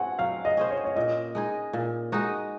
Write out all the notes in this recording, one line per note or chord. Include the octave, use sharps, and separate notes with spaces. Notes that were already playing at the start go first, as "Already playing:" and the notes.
Already playing: C4 F#4 F#5 G#5
F#3 F5
D#5
C#4 G#4 C5
C#5
C#5
A#2 D#5
G#3 D#4 G#4
A#2
G#3 D#4 F#4